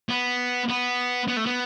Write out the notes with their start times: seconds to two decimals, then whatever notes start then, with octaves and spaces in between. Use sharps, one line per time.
0.09 B3
0.69 B3
1.28 B3
1.37 A3
1.46 B3